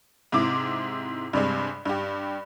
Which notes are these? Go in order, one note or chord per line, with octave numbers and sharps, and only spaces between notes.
G#2 C3 E4 D6
G2 C3 G3 G#3
G2 G4